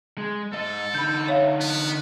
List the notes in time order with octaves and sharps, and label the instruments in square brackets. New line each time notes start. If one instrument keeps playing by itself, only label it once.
[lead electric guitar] G#3
[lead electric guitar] G#2 D#5 [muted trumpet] A4
[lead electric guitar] D3 D#4 [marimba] B5 G6
[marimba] C#5 E5 F5
[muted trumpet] B3